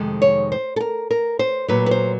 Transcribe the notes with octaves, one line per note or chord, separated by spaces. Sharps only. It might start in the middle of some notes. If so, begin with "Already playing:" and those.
Already playing: F2 C3 D#3 G#3
C#5
C5
A4
A#4
A#4
C5
A#2 F#3 B4
B4
C5